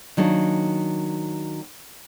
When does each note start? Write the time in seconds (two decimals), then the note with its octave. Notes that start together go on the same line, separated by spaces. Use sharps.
0.17 D#3 F#3 A#3 D4